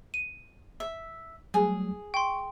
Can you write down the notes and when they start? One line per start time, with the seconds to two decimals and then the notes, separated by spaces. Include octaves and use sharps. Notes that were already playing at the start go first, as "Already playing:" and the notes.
0.14 D#7
0.80 E5
1.54 F#3 G3 A3 G#4
2.14 G5 C6 C#6